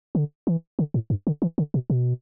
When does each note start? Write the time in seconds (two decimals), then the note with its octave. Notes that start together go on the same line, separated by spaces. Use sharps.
0.15 D3
0.47 E3
0.79 D3
0.94 A2
1.10 G2
1.27 D3
1.42 E3
1.58 D3
1.74 B2
1.90 B2